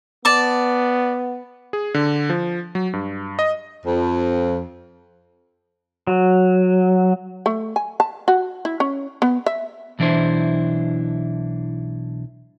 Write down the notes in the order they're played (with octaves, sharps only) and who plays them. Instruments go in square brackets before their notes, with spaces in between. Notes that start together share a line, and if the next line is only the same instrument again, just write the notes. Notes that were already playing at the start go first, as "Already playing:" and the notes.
[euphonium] B3 [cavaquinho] D5 A5 D6
[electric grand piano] G#4
D3
F3
F#3
G2
D#5
[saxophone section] F2
[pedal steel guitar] F#3
[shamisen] A3
G#5
A5
F#4
E4
C#4
B3
E5
[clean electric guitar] B1 E3 D4 E4 C5